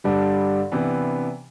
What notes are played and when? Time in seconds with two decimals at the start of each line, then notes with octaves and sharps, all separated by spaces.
0.04 G2 D3 G3 D4 A4
0.72 C3 E3 B3 D4